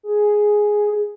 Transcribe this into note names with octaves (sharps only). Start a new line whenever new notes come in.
G#4